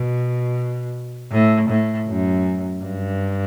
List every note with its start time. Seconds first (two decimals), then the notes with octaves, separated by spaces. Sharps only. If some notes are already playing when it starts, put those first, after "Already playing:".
Already playing: B2
1.32 A2
1.69 A2
2.08 F#2
2.84 G2